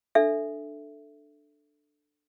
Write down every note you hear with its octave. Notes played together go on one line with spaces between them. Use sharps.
D4 A4 E5